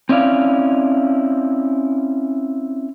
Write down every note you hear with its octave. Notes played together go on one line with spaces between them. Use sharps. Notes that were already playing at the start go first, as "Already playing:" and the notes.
C4 C#4 E4 D5 F5